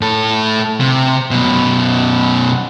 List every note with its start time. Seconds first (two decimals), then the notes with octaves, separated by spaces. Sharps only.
0.01 A2 A4
0.80 C3
1.31 F#2 B2